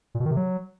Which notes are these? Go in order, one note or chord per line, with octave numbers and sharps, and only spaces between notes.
A#2
B2
D#3
C3
F#3